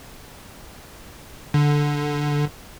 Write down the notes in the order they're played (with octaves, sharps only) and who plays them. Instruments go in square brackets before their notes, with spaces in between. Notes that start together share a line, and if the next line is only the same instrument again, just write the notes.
[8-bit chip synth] D3